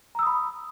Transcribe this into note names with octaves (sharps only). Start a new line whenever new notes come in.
A#5 B5 D#6 E6